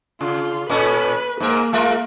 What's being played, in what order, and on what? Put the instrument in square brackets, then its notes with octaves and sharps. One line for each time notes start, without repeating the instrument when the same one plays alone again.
[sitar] C#3 [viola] F4
[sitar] A#2 C#4 A4 [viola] B4
[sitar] G#2 A#4 [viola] A#3
[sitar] G#3 F4 A#4